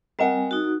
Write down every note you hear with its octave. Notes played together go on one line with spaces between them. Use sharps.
G3 C4 A#4 D#5 F#5 G#5
D#4 F#4